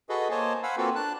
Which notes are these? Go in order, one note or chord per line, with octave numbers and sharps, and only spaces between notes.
F#4 G#4 A4 B4 D#5
A#3 C5 C#5 D#5 G#5 A5
C5 F5 F#5 G#5 B5 E6
A#3 C4 F4 F#4 A4 B4
D4 A5 F#6